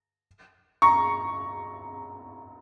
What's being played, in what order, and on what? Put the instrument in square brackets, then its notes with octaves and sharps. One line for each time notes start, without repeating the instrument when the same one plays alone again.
[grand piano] A#5 C#6